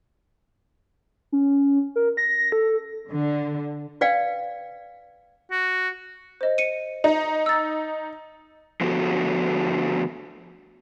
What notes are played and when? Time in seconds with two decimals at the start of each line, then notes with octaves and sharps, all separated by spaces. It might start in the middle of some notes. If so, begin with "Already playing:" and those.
1.32 C#4
1.96 A#4
2.17 A#6
2.52 A4
3.09 D3
4.01 B4 D5 F5 G5
5.51 F#4
6.41 C5 D#5
6.58 C#7 D#7
7.04 D#4
7.46 E6 A6
8.81 D3 F3 A3 B3 F#4